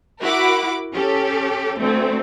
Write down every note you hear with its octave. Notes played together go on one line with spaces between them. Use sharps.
E4 F#4 A#4 F#5 B5 D6
C#4 G4 A4
D2 A3 C4